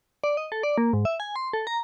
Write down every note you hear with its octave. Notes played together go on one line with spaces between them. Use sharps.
D5
D#5
A4
D5
A#3
G#2
E5
G#5
C6
A4
A#5